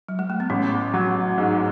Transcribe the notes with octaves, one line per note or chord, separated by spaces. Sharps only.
F#3
G#3
A3
B3
A1 C#4
F#3
G#2